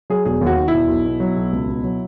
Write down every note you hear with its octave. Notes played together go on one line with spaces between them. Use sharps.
F#3 G#4
E1 G#4
D#2
F#4
D#3
E4
E1
B1
B2
F#3
B1
C#2
B2
F#3